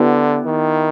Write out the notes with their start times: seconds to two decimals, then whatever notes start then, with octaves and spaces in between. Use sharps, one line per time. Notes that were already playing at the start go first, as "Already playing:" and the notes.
Already playing: D3 B3 E4 G4
0.46 D#3